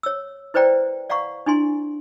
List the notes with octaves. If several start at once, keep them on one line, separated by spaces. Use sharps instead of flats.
C#5 E6
E4 B4 C5 D5 G5 A#5
D5 F5 F#5 A#5 C#6
D4 E4 G#5 C6